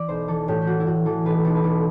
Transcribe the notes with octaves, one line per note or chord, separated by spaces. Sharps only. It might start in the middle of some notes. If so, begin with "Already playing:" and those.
Already playing: E3 D5
B1 C5
E3 A4
A2 G4
G4
E3 F#4
E4
A2 F#4
E3 A4
B1 B4
B1 A4
B4
B1 A4